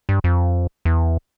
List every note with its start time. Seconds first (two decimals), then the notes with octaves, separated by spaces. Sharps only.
0.09 G2
0.24 F2
0.85 E2